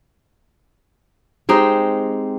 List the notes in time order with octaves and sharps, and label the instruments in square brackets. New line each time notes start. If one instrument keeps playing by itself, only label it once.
[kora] G#3 C4 D#4 G4